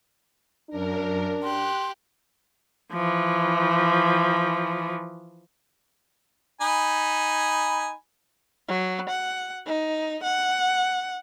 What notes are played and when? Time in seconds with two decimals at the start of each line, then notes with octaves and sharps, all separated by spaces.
0.70 F#2 D4 A#4
1.43 G4 C6 F#6
2.93 E3 F3
6.61 D#4 G#5 B5
8.68 F#3
9.09 F#5
9.67 D#4
10.23 F#5